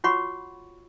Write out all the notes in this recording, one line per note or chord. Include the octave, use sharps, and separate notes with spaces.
F4 F#4 C#5 F#5 B5 C#6